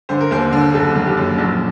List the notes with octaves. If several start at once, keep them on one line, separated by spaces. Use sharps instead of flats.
D3 C5
A#4
D#2 C5
D3
F#1 A4
D#3
G4
F#2
A#1